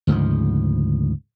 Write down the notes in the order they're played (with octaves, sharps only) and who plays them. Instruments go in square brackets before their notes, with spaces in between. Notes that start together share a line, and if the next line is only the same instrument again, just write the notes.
[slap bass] D2 G#2 C#3 F3